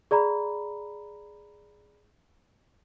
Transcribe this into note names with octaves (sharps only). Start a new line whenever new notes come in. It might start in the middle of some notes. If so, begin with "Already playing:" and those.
G#4 D5 A#5 B5